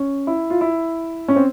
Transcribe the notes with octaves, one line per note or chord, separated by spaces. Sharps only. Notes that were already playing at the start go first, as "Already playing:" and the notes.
Already playing: C#4
E4
F4
E4
C#4
C4